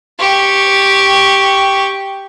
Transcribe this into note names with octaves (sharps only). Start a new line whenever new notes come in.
G4 C#6